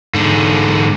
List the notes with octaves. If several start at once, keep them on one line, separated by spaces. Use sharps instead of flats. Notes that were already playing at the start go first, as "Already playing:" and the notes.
G#2 D3